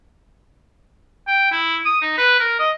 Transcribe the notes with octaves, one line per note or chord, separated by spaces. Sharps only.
G5
E4
D#6
D#4
B4
A#4
D#5